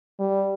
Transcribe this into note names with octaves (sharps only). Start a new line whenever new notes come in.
G3